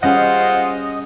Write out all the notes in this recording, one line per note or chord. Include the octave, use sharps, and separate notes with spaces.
G3 C#4 F4 G#4 C5 D#5 F#5